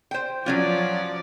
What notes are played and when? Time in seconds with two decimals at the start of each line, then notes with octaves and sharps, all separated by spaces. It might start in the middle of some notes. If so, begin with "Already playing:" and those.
0.11 C5 G5
0.46 F3 F#3 C#4 F4 D5